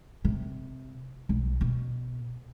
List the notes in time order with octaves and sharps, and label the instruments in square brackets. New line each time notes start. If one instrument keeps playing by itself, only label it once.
[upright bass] C3
B1
B2